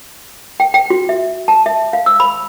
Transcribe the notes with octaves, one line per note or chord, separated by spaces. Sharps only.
G5
G5
F#4
E5
A5
E5
F5
E6
B5